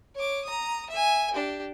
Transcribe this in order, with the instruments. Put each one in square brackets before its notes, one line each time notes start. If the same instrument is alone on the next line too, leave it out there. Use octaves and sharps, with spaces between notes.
[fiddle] C#5 D6
A#5 D#6
E5 G#5
D4 G4